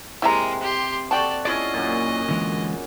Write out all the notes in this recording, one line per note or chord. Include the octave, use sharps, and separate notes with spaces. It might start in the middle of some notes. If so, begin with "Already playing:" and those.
C3 G#3 E4 A#4 E5 A#5
G4 C6
F#4 G4 A4 D5 G5 A5
C#4 E4 F4 G#4 D5 D#5
F#2 A#2
D3 E3 G#3